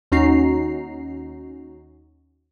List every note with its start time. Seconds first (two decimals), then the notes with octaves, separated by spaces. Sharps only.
0.12 D#2 C#4 D#4 F#4 A#5 C7